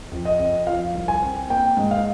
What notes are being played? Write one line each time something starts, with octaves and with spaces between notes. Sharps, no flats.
F2
D#5
F2
F3 F5
C2
G#5
C4
A#3 G5
G#2
F5